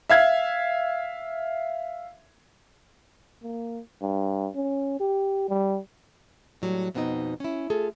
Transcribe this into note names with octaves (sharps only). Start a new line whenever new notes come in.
E5 F5 G#6
A#3
G2
C#4
G4
G3
A2 F#3 G3
F2 B2 B3 C4 D#4 D#5
C#4 E4
A3 F4 G#4 A4